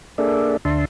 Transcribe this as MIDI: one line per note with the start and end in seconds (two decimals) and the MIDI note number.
0.18 0.57 58
0.18 0.57 62
0.18 0.57 68
0.18 0.57 69
0.18 0.57 74
0.18 0.57 76
0.65 0.85 38
0.65 0.85 50
0.65 0.85 62
0.65 0.85 76
0.65 0.85 81
0.65 0.85 84